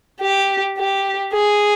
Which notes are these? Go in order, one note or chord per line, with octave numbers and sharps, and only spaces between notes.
G4
G4
G#4